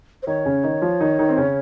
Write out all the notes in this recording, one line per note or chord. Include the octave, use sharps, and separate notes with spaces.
C5
D#3 D#4 C#5
C#3 C#4
D#3 D#4
F3 F4
D#3 D#4
D#3 D#4
C4
C#3 C#4